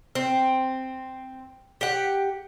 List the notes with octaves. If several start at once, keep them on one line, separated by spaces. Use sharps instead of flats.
C4
G4 F#5